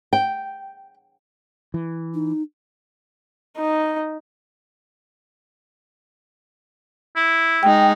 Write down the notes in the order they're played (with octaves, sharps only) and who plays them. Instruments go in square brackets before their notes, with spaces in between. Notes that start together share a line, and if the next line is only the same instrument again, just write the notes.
[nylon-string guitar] G5
[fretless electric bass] E3
[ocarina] D#4
[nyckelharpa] D#4
[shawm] E4
[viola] G#3 D#4 [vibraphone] G5